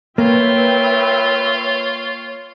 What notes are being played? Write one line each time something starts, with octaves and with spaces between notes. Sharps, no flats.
A#3 F4 B4 C#5 E5 G5